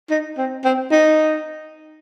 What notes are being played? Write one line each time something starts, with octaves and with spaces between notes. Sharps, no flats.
D#4
C4
C4
D#4